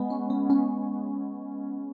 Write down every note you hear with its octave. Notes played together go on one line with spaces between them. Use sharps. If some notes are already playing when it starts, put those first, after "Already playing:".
Already playing: G#3 B3
C#4
B3
C#4